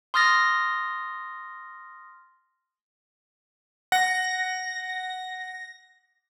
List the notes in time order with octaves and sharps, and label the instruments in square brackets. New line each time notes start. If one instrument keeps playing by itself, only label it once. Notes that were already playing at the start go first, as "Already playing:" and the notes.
[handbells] C6 D#6 F6 A6 A#6
[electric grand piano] F#5 [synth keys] A#6